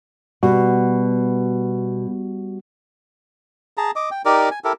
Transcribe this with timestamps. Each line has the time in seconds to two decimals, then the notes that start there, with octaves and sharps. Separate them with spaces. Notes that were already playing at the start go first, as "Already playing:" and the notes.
0.43 B2 G3 F#4
3.77 G#4 A5 A#5
3.96 D#5 D6
4.11 G5
4.25 D#4 G4 A#4 D5
4.51 G#5
4.64 E4 G4 A4 A#4